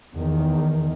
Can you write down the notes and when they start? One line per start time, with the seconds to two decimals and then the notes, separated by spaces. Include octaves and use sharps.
0.15 E2 D#3